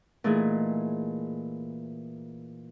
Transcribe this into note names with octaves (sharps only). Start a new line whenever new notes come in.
A#2 E3 A3 D#4 E4 G#4